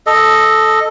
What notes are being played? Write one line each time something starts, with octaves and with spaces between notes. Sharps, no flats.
A4 D#5